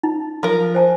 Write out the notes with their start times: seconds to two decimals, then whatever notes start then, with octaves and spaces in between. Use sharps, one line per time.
0.03 D#4
0.43 F3 A#4
0.75 C5 G#5 A5